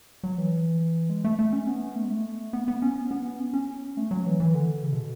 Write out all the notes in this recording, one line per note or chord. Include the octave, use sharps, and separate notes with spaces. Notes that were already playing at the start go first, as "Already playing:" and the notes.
F#3
E3
G#3
A3
A3
C#4
B3
A3
G#3
A3
B3
B3
C#4
B3
C#4
C#4
A3
F#3
E3
E3
D3
C#3
B2